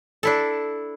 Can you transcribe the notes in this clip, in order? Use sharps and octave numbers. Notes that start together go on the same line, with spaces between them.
D4 E4 A4